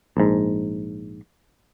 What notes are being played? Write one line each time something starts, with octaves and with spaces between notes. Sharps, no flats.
A#1 G#2